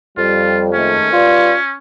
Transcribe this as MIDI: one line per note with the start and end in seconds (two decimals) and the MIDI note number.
0.18 0.94 41
0.18 0.71 55
0.18 0.62 65
0.74 1.10 51
0.74 1.10 56
0.74 1.10 57
0.74 1.77 61
1.13 1.53 55
1.13 1.56 65
1.13 1.53 71
1.13 1.53 74